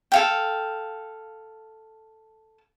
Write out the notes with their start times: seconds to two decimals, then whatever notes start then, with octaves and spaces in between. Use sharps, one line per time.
0.12 A4 F5 G5